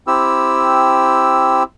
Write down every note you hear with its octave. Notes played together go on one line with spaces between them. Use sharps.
C4 E4 G4 E6